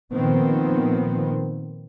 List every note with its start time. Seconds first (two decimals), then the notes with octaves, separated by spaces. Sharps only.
0.12 A#2 D#3 F3 B3 C4